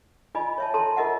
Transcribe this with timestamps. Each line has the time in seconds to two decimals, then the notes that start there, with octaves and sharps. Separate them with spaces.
0.35 F4 D5 D#5 G#5 B5
0.58 C#5 E5 A5
0.74 A4 A5 A#5 C6
0.97 F4 A#4 D#5 E5 F#5